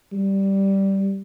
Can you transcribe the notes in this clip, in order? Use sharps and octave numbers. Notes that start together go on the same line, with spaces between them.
G3